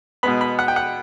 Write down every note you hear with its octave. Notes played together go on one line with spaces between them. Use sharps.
B2 G#3 B3 B5
B5
F#5
G5
F#5